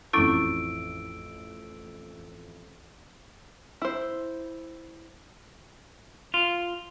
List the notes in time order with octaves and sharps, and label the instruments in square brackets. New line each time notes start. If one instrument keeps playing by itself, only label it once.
[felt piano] A1 F2 D6 [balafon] C#4 E4 A4 [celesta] E6 D7
[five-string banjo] E4 C5
[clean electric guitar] F4